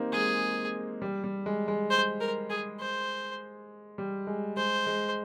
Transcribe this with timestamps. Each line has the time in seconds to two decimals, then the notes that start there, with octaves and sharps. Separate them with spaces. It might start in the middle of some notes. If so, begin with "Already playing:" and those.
Already playing: A#3 C4 D#4 G4
0.13 G#3 G#4
1.02 G3
1.24 G3
1.46 G#3
1.68 G#3
1.90 C5
2.20 A#4
2.49 G#4
2.80 C5
3.98 G3
4.27 G#3
4.56 G#3 C5
4.86 G#3